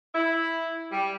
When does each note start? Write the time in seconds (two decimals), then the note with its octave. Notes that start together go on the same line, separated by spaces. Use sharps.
0.15 E4
0.91 G3